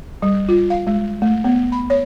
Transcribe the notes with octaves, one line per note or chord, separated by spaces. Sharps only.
G3
F4
F5
G#3
A3
B3
B5
C#5